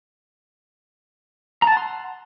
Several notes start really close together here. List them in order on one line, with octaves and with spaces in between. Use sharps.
A#5 A5 F#5 C6